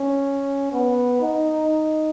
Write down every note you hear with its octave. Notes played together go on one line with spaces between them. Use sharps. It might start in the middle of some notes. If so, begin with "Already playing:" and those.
Already playing: C#4
B3
D#4